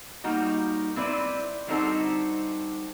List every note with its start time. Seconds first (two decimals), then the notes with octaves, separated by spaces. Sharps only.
0.24 G3 A#3 D#4 F#4
0.96 C4 E4 B4 D5
1.67 D3 G3 C4 D#4 F#4 A4